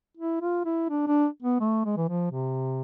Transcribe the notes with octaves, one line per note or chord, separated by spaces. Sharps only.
E4
F4
E4
D4
D4
B3
A3
G#3
E3
F3
C3